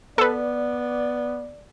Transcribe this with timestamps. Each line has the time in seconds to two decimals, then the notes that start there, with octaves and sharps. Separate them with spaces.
0.18 B3 A4 B4 D5